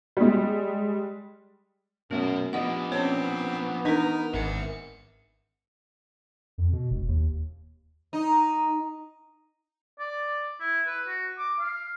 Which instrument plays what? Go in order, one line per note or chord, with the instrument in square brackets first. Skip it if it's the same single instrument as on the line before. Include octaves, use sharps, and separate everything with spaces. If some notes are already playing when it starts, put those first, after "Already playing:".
[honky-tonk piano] G3 G#3
[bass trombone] F#2 [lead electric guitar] B2 F#4 [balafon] A3 C#4
[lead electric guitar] F3 D4 [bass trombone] B3 [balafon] G4 D#5 F#5
[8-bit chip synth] C4 [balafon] C#4 C#5
[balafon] E3 D4 B4 [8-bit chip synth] D#4 A#4
[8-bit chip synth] G#1 C#7 [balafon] D#3 A#4 [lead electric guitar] E5 F#5
[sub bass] F2
B2
E1
D#2
[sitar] D#4
[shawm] D5
E4
B4
F#4
D6
F5